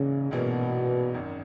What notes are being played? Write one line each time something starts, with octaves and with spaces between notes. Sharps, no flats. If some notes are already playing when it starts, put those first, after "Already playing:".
Already playing: A#1 G#2 C#3 E3 A#3 C#4
A#1 G#2 B2 E3 A#3 C#4
G#1 F#2 D#3